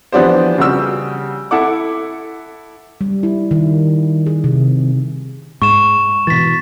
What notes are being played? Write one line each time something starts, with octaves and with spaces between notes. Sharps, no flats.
E3 F3 B3 D4 G4 C5
C#3 G3 F#4 G4 E6
E4 A4 F#5 D6
G3
E4
D#3
G#4
C3
G#2 C#6 E7
B2 E3 A6 B6